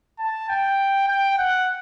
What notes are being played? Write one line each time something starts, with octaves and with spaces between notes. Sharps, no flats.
A5
G5
G5
F#5